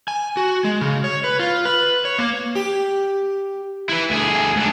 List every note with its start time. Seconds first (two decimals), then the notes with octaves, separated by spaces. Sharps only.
0.08 G#5
0.37 F#4
0.64 G#3
0.81 C#3
1.04 C#5
1.24 B4
1.39 F4
1.65 B4
2.05 C#5
2.19 A#3
2.55 G4
3.89 E4 B4
4.10 D2 G#4
4.57 G#2 D4